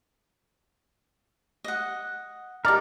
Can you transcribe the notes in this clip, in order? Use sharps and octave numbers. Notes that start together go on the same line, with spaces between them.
D#5 F#5
D#4 G4 A#4 D5